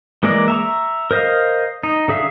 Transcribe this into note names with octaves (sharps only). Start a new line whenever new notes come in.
E3 G#3 A#3 A#4 D5
E5 A#5 C#6
A#4 C5 D#5 F5
D#4
D3 G#4 E5 F5